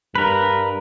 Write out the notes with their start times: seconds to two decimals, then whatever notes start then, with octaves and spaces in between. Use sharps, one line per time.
0.15 G2 A#4 B4